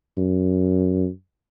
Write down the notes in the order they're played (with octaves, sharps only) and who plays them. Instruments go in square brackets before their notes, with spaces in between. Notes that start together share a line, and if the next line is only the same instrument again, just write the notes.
[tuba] F#2